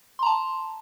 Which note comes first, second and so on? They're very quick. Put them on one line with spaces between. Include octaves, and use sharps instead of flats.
C6 A#5 A5